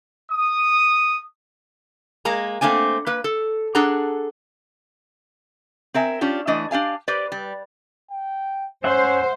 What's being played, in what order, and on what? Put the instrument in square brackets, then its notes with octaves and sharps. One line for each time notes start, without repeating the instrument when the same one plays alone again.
[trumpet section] D#6
[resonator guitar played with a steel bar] G#3 A#3 A#5
A3 A#3 C4 D4 G#5
A#3 B4
A4
D4 G#4 A4 F#5 A#5
C4 A#4 E5 G#5
C#4 D4 F4 G4
E3 A3 D4 D#5
D4 G4 F5 G#5
G4 B4 C5 D5
G3
[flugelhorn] G5
[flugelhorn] C#4 [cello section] C5 [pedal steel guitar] E5 F#5 C6